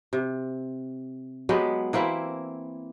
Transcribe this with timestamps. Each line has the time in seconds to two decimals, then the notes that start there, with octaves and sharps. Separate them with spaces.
0.13 C3
1.49 F#3 G#3 B3 G4
1.93 E3 A#3 C4 E4